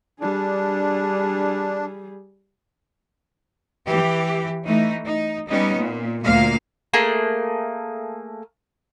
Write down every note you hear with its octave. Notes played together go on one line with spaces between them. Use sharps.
G3 D4 G#4
E3 G4
E3 A3 D#4
D#4
G3 B3 C#4 D#4
A#2
D2 A#2 A#3 F5
A3 A#3 G#4